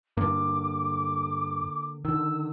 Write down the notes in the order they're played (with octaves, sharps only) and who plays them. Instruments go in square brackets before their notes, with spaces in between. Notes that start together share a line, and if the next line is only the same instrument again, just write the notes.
[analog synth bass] G2 [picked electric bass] D3 A#3 [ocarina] D6
[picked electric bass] D3 D#3 [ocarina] E6